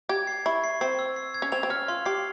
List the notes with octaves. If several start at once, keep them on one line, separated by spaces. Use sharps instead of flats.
G4 G#6
C7
E4 C#6
C7
C4 C7
E6
C7
G#6
C#4
C4 F7
C4
C#4 F6
F4 C6
G4 C7